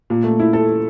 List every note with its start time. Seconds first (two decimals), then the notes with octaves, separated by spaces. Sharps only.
0.10 A#2
0.24 A3
0.40 E4
0.53 A4